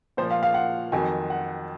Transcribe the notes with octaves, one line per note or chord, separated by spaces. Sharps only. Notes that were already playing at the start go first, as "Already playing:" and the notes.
A#2 F3 C5
F5
F5
F#5
F2 D#3 F#3 G#5
F#5